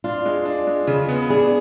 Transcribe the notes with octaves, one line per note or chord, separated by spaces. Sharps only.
D4 F4
G#3
D4
G#3
C#3
B3
D4 G#4